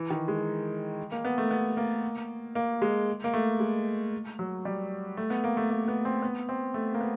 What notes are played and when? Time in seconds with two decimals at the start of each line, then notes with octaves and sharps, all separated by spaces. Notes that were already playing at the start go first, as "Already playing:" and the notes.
Already playing: E3
0.10 D#3
0.28 G#3
1.12 A#3
1.25 B3
1.38 A3
1.51 B3
1.77 A#3
2.55 A#3
2.82 G#3
3.24 A#3
3.34 A3
3.60 G#3
4.39 F#3
4.65 G3
5.17 A3
5.30 B3
5.44 A#3
5.57 A3
5.70 A#3
5.88 B3
6.05 C4
6.22 B3
6.49 C4
6.74 A3
6.94 A#3
7.01 B3